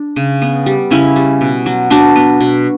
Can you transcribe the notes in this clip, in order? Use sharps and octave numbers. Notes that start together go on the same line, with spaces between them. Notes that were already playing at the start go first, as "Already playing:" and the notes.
Already playing: D4
C#3
B3
G3
C#3 C#4 E4
G3
B2
F#3
B3 D4 F#4
B3
B2